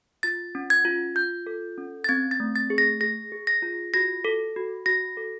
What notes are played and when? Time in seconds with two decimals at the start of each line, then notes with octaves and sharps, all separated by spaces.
0.23 F4 A6
0.55 C#4
0.70 G#6
0.85 F4
1.15 F4 G6
1.47 A4
1.78 C#4
2.04 A6
2.09 C4 G#6
2.31 A6
2.40 A3
2.56 A6
2.70 G#4
2.78 A#6
3.01 G#4 A#6
3.32 G#4
3.47 A#6
3.62 F4
3.94 F#4 A#6
4.25 A4
4.56 F#4
4.86 F#4 A#6
5.17 A4